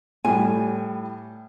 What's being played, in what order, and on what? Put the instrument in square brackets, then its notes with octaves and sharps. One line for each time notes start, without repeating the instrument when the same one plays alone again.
[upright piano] A2 G3 [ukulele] G#5